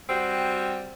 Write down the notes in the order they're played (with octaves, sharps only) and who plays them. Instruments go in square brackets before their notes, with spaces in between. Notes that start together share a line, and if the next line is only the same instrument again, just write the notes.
[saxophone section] G3 C4 F#4